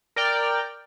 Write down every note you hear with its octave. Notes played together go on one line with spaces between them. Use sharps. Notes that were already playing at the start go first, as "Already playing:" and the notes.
A#4 D5 G5 F6